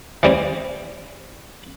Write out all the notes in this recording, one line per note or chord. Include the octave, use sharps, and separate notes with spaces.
E3 G3 C4